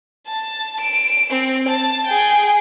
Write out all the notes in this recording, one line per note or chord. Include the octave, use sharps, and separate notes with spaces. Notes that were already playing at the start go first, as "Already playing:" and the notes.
A5
D7 E7
C4
A5
G#4 G5